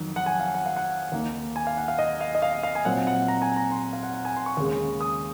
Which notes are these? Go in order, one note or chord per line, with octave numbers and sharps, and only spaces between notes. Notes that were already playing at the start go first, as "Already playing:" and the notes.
Already playing: F2 D#3 F#3
F#5
G#5
F5
F#5
F5
F#5
D#2 D#3 A#3 D#4
G#5
F5
F#5
F5
D#5
F5
D#5
F5
F5
G#5
A#2 F#3 C4 F#5
F#5
A#5
G#5
A#5
C6
F5
F#5
F#5
G#5
C6
C#6
D#2 C#3 G#3
D#6